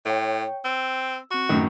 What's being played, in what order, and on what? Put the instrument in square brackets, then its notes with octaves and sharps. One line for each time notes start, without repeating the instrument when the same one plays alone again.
[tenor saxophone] A2 [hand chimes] C#5 G5
[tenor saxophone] C4 [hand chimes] E6
[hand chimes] C4 C#6 [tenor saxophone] F#4
[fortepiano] F#2 A2 D#3